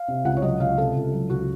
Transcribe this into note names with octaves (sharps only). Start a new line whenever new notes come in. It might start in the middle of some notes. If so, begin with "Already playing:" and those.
Already playing: F5
C3
C#2 F#5
C#5
F#3 D#5
C#2 F5
C3 A4
C#2
F#3
C#2 F#4